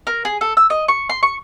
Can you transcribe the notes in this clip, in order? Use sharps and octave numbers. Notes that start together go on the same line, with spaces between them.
A#4
G#4
A4
E6
D#5
C#6
C6
C#6